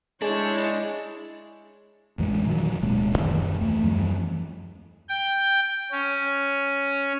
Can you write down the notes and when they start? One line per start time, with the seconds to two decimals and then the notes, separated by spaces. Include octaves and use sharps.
0.22 G#3 D4 E4 G#4 C#5 G6 E7
2.18 A1 F2 E3 G#3
2.46 A#2 D#3 F3 F#3
2.82 D1 B2 G#3 A#3
3.15 F#2 D#3 E3
3.61 D#2 A3
3.83 F#2 E3 F3 G3
5.09 G5
5.91 C#4